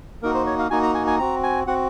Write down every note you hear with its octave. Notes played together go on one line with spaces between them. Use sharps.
A#3 D#4 F#4 A#4
C5
C#5
F5
A#3 D#4 F#4 G#5
A#5
G#5
G#5
C4 F#4 A#5
G#5
C4 F#4 F#5